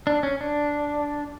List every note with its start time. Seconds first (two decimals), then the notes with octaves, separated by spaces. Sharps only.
0.07 D4
0.23 C#4
0.41 D4